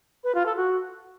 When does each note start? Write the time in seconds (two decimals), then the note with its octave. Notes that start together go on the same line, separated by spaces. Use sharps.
0.24 B4
0.35 F4
0.46 A4
0.57 F#4